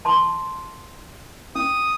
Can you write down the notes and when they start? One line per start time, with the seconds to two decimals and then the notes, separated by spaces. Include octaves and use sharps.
0.05 A5 C6 D6
1.55 C#4 D#6